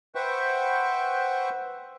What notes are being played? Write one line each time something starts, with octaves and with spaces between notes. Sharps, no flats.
B4 C5 E5 F#5 G5 C#6